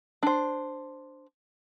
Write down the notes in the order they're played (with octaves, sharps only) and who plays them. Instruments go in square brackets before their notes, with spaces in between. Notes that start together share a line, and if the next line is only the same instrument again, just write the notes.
[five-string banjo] D4 C5